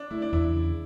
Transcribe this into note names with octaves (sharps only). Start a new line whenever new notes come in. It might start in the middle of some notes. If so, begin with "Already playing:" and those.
Already playing: D4
A3 E4
D4
E2 E4
C#3